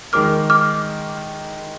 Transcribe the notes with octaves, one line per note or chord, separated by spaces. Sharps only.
D#3 G#3 D#4 A#4 D6 F6
D6 F6